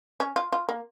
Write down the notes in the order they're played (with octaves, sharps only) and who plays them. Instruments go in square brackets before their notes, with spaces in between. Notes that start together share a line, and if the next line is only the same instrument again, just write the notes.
[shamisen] C#4
F4
F4
A#3